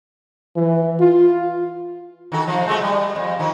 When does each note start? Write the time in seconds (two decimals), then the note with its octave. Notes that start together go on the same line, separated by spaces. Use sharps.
0.56 E3
1.00 F4
2.32 D#3 F#4 A4
2.47 C3 F3
2.67 G#3 A3 F#4
2.82 G3
3.16 F2
3.39 D#3 F3